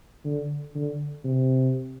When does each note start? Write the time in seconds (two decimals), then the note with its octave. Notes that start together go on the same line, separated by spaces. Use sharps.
0.25 D3
0.75 D3
1.25 C3